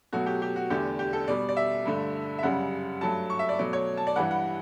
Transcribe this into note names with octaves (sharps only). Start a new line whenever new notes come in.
B2 F#3 A3 F#4
G4
G4
F#4
E2 D3 A3 G4
G4
A4
B2 G3 D5
D5
E5
G2 D3 A3
E5
F#2 C#3 G3 F#5
G2 F#3 A3 A5
C#6
E5
D5
B2 F#3 A3 D5
C#5
A5
D5
G2 E3 G3 F#5
F#5